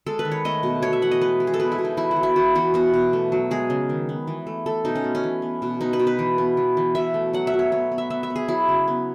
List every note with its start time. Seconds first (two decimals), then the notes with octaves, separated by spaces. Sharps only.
0.06 G#3 A4
0.19 B4
0.25 D#3
0.32 C#5
0.45 A3 D#5
0.63 B2
0.82 A3 C#5
0.93 E5
1.02 E3 F#5
1.11 D#5
1.21 G#3 B4
1.40 G#3
1.47 G#4
1.54 A4
1.60 B2 B4
1.72 E4
1.79 B2
1.85 D#4
1.97 E3 E4
2.11 F#4
2.16 E3
2.23 E4
2.36 E3 F#4
2.55 E3 F#4
2.74 B3 F#4
2.94 B2
3.13 A3
3.32 F#3
3.51 G#3 G#4
3.70 C#3
3.89 D#3
4.09 B3
4.27 E3
4.47 A3
4.66 A3 A4
4.85 B2 D#4
4.95 C#4
5.04 B3
5.15 C#4
5.23 E3
5.42 B3
5.62 B2
5.81 B3 D#4
5.93 B4
5.99 B2
6.07 B4
6.19 E3
6.38 B3
6.57 E3
6.77 E3
6.95 B2 E5
7.14 A3
7.33 F#3 F#5
7.47 E5
7.54 F#3
7.59 C#5
7.72 B3 C#5
7.92 B3
7.98 E5
8.10 B3 E5
8.23 E5
8.30 B3
8.36 G#4
8.48 F#3 E4
8.68 C#3
8.88 B3